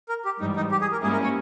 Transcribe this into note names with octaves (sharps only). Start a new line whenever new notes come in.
A#4
G4
G#2 E3 G3 D#4
D#4
G4
G#4
A#4
G#2 G3 A#3 C#4 E4 G#4
A#4
C#5